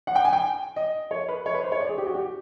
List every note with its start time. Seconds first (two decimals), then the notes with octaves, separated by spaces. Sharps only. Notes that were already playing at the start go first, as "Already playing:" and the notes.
0.07 F#5
0.15 G5
0.25 G#5
0.33 G5
0.76 D#5
1.11 C#5
1.28 B4
1.46 C#5
1.54 B4
1.63 C5
1.72 C#5
1.80 D5
1.89 G#4
1.98 G4
2.06 F#4
2.14 G4